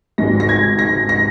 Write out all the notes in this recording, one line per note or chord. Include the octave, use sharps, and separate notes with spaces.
G#1 G#2 G#3 A#6
A#6
G#6
A#6
A#6